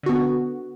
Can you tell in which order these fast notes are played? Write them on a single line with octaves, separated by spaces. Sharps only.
D3 F#4 B3